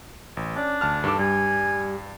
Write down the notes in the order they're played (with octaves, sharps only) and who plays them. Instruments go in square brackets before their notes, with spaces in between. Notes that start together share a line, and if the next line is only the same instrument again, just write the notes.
[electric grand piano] A1
[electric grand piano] C#4 D5 [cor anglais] D4
[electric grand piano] D2 A5 F6
[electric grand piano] G2 D6 [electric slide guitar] D#3 A4
[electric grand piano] G2 [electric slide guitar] G3 [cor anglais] G#5